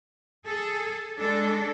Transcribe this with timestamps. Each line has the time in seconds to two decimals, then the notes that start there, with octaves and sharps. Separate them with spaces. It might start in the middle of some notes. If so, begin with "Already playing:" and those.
0.46 G#4 A4
1.19 G#3 D4 A4